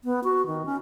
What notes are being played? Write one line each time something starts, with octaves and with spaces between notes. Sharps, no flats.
B3
F#4
D#3
C#4